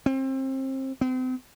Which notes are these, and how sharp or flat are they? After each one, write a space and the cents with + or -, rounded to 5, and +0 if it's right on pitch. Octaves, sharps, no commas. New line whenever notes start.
C4 +30
C4 -35